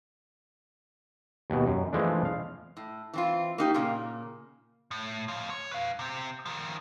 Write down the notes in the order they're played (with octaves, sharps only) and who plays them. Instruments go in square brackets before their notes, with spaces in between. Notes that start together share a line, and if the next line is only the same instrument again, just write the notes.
[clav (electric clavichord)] D#2 B2
F#2
E3 F3 G#3 A3 D4
F5
[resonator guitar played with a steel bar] A2
E3 C4 F4
A#3 D#4 G4
A#2 C#3 A#3
[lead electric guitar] A2
F2 F4
C#5
B4 F5
C3 C4
D#3 F3